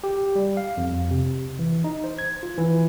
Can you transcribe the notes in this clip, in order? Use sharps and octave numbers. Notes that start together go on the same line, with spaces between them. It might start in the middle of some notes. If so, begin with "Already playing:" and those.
G4
G3
F5
F2
C3
E3
D#4
C5
G#6
F4
E3